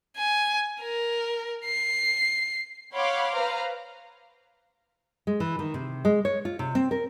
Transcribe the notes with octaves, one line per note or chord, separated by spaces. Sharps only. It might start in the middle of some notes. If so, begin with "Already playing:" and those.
G#5
A#4
C7
C#5 F5 F#5 B5 C6 D6
B4 C5 F5 A#5
G#3
E3
D#3
C3
G#3
C#5
F4
C3
C4
A#4